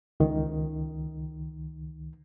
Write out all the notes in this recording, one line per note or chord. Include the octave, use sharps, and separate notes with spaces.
C#2 D#3